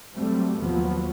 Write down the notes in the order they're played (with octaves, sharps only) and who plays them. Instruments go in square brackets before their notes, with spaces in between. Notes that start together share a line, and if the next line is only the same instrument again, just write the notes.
[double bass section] F#3 G3 A3 C4
D#2 F3 F#3 B3